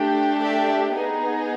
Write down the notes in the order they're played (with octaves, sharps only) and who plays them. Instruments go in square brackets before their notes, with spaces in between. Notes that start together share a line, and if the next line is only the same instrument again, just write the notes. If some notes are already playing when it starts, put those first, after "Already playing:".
Already playing: [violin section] A3 D4 G4
D5 E5
B3 D#4 G#4